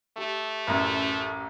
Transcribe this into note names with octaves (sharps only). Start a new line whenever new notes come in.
A3 G4
A1 F#2